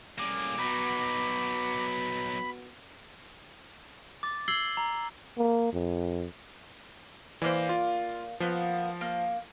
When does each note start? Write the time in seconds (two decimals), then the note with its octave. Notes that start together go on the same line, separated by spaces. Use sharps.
0.19 A2 G3 A#3 C#4 G#4 D6
0.59 F#3 B3 D#4 F#4 B5
4.23 D6 A6
4.48 E6 G#6 C7 F#7 G7
4.77 A#5
5.37 A#3
5.73 F2
7.42 E3 A#3 C5 D5
7.69 F4
8.40 F3 A#3 B3
9.01 A#3